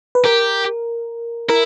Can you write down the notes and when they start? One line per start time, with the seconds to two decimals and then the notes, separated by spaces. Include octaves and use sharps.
0.15 B4
0.25 G4 A#4
1.49 E4 A#4